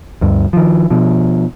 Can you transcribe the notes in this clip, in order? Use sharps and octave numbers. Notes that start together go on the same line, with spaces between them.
D2 G2
D#3 F3
B2 F3